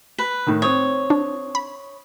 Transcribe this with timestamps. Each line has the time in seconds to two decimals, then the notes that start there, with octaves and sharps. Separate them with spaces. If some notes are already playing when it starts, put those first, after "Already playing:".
0.18 B4
0.47 A2 D#3
0.62 C4 C#5 D#6
1.10 D4
1.55 B5